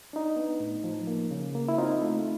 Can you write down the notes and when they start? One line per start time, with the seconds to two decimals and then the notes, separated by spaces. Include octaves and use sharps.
0.13 D4 D#4
0.36 B3
0.60 A2
0.84 F3
1.07 A#3
1.31 C#3
1.55 A#3
1.68 E4
1.78 C4 D#4 F4
2.02 A3